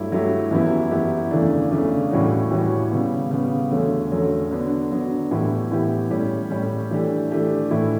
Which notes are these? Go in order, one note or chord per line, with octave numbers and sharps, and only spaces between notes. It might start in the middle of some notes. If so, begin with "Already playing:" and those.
Already playing: G2 F#3 A3 E4 G4
G2 F#3 A3 E4 G4
F#2 E3 B3 E4 G4
F#2 E3 B3 E4 G4
E2 C#3 E3 A3 D4
E2 C#3 E3 A3 D4
A2 E3 G3 C#4 F#4
A2 E3 G3 C#4 F#4
C#3 G3 B3
C#3 G3 B3
E2 D3 F#3 A3 C#4
E2 D3 F#3 A3 C#4
D3 F#3 B3 D4
D3 F#3 B3 D4
A2 E3 B3 E4 G4
A2 E3 B3 E4 G4
A2 G3 C#4 G4
A2 G3 C#4 G4
E3 A3 D4 G4
E3 A3 D4 G4
A2 E3 A3 E4